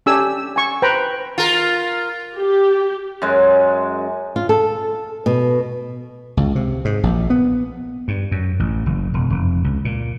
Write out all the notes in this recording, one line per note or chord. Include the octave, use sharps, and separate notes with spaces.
C#4 D4 G4 A4 G#5 E6
G#5 C#6
B4 C5 G5 A#5 B5
F4 A#4
G4
F#2 G#3
F4
A4
B2
C#2
C3
G#2
A#1
B3
G2
F#2
A1
F#1
E1
F1
C#2
A#2